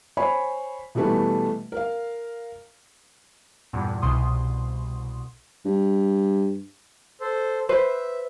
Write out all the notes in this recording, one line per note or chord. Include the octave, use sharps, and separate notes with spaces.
C5 C#5 G#5 B5
B2 E3 G3 A3 B4
A#4 F5
E2 G2 A#2
C2 B2 C6 D#6
G2
A4 C5
B4 C5 E5